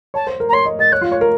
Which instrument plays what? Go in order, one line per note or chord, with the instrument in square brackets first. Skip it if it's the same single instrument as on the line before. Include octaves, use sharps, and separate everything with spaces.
[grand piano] C#5 [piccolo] A5
[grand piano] C5
A#4
[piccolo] A#5
[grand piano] C#5 [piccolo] C6
[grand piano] D#5
[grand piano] D#5 [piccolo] A6
[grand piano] C#5 [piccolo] F#6
[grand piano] F4
C#5
A#4